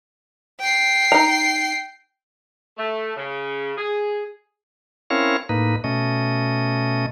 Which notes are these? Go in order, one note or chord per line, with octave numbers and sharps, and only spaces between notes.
G5 C7
D#4 A#5
A3
C#3
G#4
C4 C#4 E4 A#4 C#5 F5
A2 A#3 D#4 B4
B2 A3 C#4 D#5